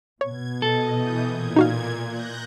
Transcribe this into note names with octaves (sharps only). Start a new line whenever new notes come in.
B2 C#5 G#6
A4 D#5
E3 D#6 G6
A#2 G#6
D#4 F#4 F5
F#6 G6 A#6